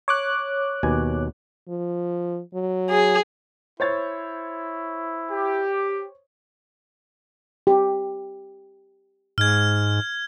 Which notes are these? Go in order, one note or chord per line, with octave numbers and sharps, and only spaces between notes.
C#5 D6 F#6
D#2 B2 G#5
F3
F#3
G#4
E4 C5 C#5 A6
G4
G4
G#2 F6 G#6